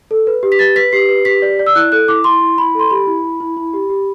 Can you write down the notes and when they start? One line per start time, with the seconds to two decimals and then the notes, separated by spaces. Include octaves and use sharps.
0.11 A4
0.27 B4
0.43 G4
0.52 B6
0.59 B4 A6
0.76 B4 B6
0.92 G4 C7
1.09 B4
1.25 G4 B6
1.42 D5
1.59 D5
1.67 E6
1.75 E4 F#6
1.92 A4 F#6
2.08 E4 D6
2.24 E4 C6
2.41 E4
2.58 E4 B5
2.75 A4 C6
2.90 G4 B5
3.07 E4
3.24 E4
3.40 E4
3.57 E4
3.73 G4
3.90 G4